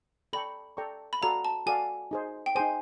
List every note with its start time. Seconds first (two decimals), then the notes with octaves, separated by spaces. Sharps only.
0.33 A4 D5 G5 A#5 B5 C#6
0.77 A4 D5 G5 A#5 C#6
1.13 B5
1.22 F#4 A4 D5 F5 A#5
1.45 A5
1.66 F#4 A4 D5 F5 G#5
2.11 D#4 G#4 C5
2.46 G5
2.55 D#4 G#4 C5 G#5